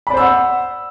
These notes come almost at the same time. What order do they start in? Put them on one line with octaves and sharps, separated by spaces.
B5 D5 C5 E6 F#5